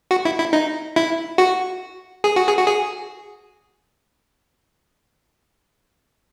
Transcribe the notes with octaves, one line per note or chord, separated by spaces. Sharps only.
F#4
E4
E4
D#4
E4
F#4
G#4
F#4
G#4
F#4
G#4